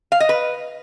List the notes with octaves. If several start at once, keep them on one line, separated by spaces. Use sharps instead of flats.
F5
D#5
B4